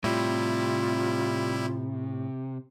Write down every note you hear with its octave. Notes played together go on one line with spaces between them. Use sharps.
A2 C3 G3 E4 F4